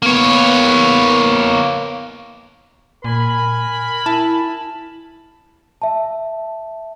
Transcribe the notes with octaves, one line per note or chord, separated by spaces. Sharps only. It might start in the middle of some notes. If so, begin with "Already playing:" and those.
A#3 B3 C#5
A#2 A#4 G#5 B5
E4 A5
E5 A5